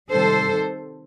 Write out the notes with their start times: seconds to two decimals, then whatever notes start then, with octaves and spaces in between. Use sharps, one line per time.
0.10 C3 D#3 G3 A4 C5